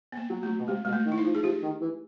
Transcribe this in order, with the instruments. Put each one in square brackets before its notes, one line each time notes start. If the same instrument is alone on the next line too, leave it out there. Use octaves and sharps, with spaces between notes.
[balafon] B3
A#3
[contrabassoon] F#3
[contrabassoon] F#3 [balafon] A3
[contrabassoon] B2
[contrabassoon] C3 [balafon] G#3
[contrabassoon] B2 [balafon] G#3
[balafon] A3
[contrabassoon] D#3
[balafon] E4
D#4
[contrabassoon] F3
[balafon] G#4
[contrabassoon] F3 [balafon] G4
[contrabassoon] D#3
E3